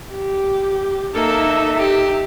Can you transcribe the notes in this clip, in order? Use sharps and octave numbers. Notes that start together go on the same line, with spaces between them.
G4
A#3 D#4 A4 E5
G4